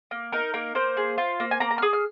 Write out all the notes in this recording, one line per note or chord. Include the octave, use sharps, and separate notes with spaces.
A#3
D#4 A#4
A#3 A#4
A#3 C5
G#4
F4
A#3
G#5
A#3 A#5
A#5
F6
G#4 D#6
F6